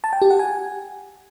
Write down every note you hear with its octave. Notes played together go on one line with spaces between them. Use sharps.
A5
G5
G4
F#5
G#5